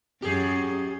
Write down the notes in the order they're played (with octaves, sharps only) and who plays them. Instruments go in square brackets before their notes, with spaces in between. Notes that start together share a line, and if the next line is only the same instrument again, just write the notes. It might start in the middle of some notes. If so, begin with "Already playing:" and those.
[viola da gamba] F#2 [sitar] G4 G#4